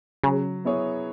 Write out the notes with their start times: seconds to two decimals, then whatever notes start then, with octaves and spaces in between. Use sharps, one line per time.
0.24 C#3 F#3
0.65 B3 E4 G#4 C#5